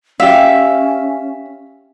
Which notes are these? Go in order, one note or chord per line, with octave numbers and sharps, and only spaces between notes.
C#4 G4 E5 F5